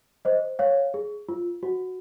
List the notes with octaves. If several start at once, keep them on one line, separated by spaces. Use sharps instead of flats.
C5 D#5
C#5 F5
G#4
F4
F#4